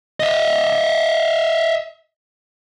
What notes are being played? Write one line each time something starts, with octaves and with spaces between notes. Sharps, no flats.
D#5 E5